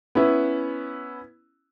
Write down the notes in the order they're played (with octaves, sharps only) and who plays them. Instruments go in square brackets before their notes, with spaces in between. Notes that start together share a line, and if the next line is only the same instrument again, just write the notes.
[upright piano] B3 C#4 E4 B4